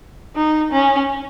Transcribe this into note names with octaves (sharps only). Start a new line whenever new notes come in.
D#4
C#4